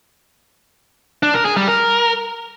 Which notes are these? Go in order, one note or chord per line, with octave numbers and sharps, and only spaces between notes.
D4
A#4
G#4
G3
A#4